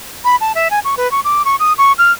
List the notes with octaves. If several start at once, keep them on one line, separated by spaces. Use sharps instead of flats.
B5
A5
E5
G#5
C#6
B4
C#6
D6
C#6
D#6
C#6
F6